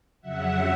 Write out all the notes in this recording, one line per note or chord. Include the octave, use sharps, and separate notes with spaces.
F2 C#3 F#3 E5 F#5